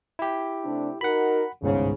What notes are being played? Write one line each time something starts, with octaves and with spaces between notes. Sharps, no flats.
E4 G4
C3 A3 D4
D#4 F#4 A#4 F#5 B5
G1 C2 G#2 C#3